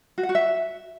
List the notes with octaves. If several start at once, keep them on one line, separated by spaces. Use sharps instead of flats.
F#4
F#5
F#4
E5